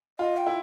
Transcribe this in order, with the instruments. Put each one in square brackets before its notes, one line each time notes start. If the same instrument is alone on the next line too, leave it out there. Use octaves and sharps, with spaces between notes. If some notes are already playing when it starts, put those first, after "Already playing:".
[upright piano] F4 [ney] D#5
[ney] G5
[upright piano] E4